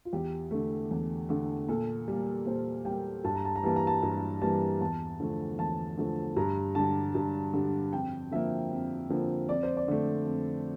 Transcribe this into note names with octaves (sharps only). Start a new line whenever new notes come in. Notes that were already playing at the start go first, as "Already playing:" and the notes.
F4
E2 G4
D3 A3
E2
D3 A3
A#2 A4
G3 A#3
A#2 C5
G3 A#3 G5
G2 A5
A#5
A5
A#5
E3 G3 A#3 A5
A#5
A5
G2 A#5
E3 G3 A#3 A5
E2 A5
D3 F3 A3
E2 A5
D3 F3 A3
G2 A#5
D3 G3 A5
G2
D3 G3
F2 G5
D3 F3 A#3 E5
F2
D3 F3 A#3
F2 D5
C5
D5
D3 A3
F2